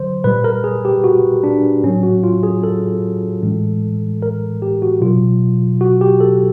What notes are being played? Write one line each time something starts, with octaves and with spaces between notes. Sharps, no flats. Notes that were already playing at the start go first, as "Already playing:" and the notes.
Already playing: D3 F#3 C5
A#2 G3 B4
A#4
G#4
G4
F#4
D4
A2 F#3 C#4
F#4
F4
G#4
A4
A2 E3 G#3
A#4
G4
F#4
B2 F#3 F4
F#4
G4
A4